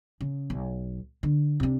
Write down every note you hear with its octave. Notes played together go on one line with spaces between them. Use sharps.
C#3
B1
D3
C3 D4